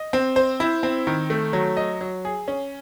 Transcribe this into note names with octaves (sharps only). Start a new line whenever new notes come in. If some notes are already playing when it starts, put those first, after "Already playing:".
Already playing: D#5
C4
C5
E4
C4
D#3
A3
F#3
D#5
F#3
G#4
C#4